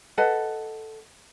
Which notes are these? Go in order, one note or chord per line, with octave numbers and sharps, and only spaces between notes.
A4 B4 D#5 F#5